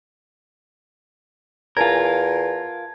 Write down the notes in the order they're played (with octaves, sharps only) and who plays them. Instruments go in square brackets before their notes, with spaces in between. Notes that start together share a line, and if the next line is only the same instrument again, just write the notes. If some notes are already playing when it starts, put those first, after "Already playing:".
[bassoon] E2 [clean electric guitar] F4 A#4 [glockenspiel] G#5 A5 G#6